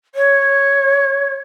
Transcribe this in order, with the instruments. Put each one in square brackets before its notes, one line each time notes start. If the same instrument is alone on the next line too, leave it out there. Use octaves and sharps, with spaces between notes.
[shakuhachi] C#5